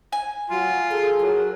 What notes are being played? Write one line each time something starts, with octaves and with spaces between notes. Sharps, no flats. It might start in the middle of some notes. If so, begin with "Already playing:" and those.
G#5
F#3 F4
G#4 A4
F#3 A#4